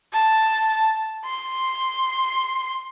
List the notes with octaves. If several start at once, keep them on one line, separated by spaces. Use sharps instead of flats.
A5
C6